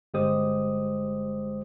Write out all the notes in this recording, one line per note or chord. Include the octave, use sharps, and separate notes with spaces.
G1 G#3 G4 C5 D#6